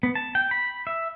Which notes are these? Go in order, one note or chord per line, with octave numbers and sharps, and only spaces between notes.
B3
A5
G5
B5
E5